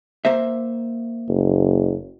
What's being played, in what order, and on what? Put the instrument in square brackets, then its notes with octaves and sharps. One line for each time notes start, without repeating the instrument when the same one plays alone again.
[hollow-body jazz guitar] A#3 C5 E5
[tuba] F#1